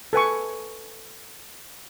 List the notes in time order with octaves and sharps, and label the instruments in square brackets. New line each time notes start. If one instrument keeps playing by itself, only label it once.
[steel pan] A4 B4 G#5 C#6